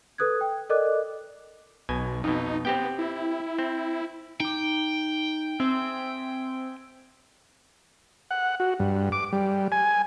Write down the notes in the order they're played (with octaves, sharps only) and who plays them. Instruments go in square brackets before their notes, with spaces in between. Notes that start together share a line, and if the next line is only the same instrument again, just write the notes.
[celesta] A4 B4 D#6 F#6 G#6
G5
A4 A#4 D5 D#5 D6 F#6
[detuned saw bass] B1 [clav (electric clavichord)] B2 G#5
[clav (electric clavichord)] F2 B2 [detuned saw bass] D#4
[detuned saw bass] B3 [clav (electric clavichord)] C4 G4 G5
[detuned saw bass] E4
[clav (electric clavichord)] C4
[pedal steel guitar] D#4 D6 [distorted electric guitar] G5
[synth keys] C4 [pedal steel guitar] G#4 E5
[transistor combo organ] F#5
F#4
G2
D6
G3
G#5